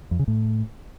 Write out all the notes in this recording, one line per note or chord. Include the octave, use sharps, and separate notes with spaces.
F2
C#3
A2